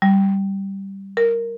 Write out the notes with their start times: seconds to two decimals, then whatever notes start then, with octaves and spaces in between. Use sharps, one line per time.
0.02 G3
1.17 A#4